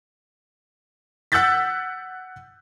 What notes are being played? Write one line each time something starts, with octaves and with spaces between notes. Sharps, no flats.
F#5 E6 F#6 G6 A6 B6